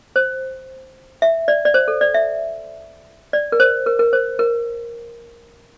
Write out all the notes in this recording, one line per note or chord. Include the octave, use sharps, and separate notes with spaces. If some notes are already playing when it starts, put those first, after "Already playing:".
C5
E5
D5
D5
C5
A4
D5
E5
D5
A#4
C5
A#4
A#4
C5
A#4